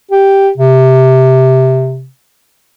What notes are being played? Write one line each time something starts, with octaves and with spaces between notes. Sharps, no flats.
G4
C3